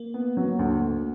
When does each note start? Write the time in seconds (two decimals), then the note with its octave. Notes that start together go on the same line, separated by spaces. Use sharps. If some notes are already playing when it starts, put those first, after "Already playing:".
Already playing: A#3
0.14 B3
0.37 F#3
0.59 D2
0.80 D2